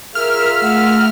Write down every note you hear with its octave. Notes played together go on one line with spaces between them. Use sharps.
F4 G#4 A#4 E5 F6
A3 F#5